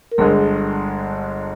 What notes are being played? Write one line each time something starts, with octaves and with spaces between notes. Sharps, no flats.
A#4
G1 G2 D3 G#3 G#4